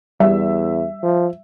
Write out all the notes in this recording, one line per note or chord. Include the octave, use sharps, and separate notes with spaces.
E2 G3 E5
F3